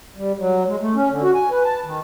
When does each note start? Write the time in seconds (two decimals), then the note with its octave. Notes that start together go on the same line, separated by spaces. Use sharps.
0.16 G3
0.39 F#3
0.67 G#3
0.81 A3
0.95 C#4
1.11 D3
1.23 F#4
1.34 G#5
1.51 B4
1.64 A5
1.85 D#3